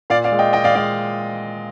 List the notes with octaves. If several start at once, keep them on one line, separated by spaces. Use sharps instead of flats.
A#2 D5 F5
D5 F5
G#3
D#5 G5
A#2 D#5 G5
D5 F5
G#3 D5 F5